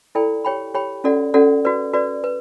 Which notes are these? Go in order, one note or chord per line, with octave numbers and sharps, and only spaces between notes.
E4 A4 D5 G5 B5
G4 C#5 G5 B5
G4 C#5 G5 B5
C#4 F#4 A4 D5 F#5
C#4 F#4 A4 D5 F#5
F#4 B4 D5
F#4 B4 D5
B4